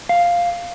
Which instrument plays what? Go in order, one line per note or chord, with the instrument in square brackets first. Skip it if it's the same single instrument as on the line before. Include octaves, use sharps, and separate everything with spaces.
[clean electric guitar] F5